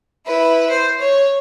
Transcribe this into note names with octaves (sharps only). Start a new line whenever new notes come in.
E4 B4
C5
C#5